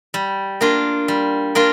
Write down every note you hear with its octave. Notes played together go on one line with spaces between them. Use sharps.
G3
A#3 D4 F4
G3
A#3 D4 F4